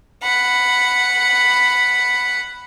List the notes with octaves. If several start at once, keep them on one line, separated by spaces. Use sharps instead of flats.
F#5 B5